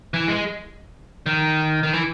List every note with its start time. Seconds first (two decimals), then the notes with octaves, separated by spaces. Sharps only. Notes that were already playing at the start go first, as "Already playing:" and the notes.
0.14 E3
0.28 G#3
1.26 D#3
1.83 D#3
1.93 E3